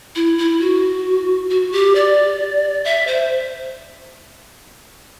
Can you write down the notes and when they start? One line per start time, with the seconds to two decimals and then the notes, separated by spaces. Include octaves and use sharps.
0.16 E4
0.38 E4
0.61 F#4
1.50 F#4
1.72 G4
1.95 D5
2.85 E5
3.07 C5